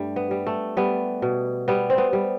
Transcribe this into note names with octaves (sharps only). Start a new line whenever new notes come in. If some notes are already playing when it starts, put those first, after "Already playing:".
Already playing: G2 G3 A3
B3
G3
A3
G3 B3
B2
G3 B3
C4
B3
G3